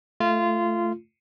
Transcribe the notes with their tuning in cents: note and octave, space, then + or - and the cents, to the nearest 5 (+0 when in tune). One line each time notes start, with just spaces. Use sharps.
A3 +0 F4 -20